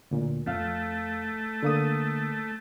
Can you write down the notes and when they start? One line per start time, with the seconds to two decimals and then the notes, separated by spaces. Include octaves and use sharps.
0.11 D2 A#2
0.47 F2 A3 F5
1.63 D3 A#3 D#6